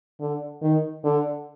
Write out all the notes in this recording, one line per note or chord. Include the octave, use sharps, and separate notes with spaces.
D3
D#3
D3